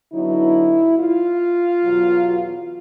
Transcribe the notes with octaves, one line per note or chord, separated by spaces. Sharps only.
D3 F#3 B3 D#4 E4
F4
E2 B2 F#3